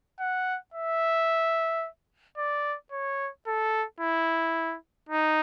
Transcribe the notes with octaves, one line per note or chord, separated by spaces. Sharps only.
F#5
E5
D5
C#5
A4
E4
D#4